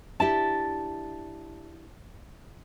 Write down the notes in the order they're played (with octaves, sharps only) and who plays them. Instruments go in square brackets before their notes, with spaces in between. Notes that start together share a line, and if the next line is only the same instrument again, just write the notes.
[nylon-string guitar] D4 E4 G4 [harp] A5